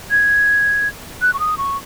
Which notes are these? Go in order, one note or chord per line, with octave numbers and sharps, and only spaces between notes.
G#6
F#6
C#6
D#6
C#6